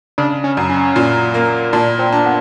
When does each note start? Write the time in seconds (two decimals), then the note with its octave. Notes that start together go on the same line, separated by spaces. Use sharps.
0.18 C#3 D4
0.44 C#4
0.57 F#2
0.70 C#4
0.96 A#2
1.34 A#3
1.73 A#2 D4
1.99 C4
2.12 D4
2.25 B3